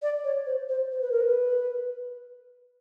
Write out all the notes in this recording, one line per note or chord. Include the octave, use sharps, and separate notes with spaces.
D5
C#5
C5
C5
C5
B4
A#4
B4